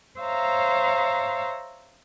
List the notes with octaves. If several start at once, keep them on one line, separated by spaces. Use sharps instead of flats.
C5 C#5 E5 F5 A#5